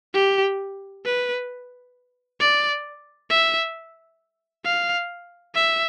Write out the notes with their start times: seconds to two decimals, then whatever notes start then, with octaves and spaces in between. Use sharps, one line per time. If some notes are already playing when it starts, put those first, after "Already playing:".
0.14 G4
1.05 B4
2.40 D5
3.30 E5
4.65 F5
5.55 E5